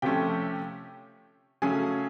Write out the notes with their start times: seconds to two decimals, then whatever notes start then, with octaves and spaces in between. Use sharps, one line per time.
0.02 C3 F3 A3 C#4 G4 G5
1.62 C#3 F#3 A3 C#4 G#4 G#5